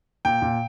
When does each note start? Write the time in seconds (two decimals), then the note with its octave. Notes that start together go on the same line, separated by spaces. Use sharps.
0.25 A#2 G5
0.42 A#2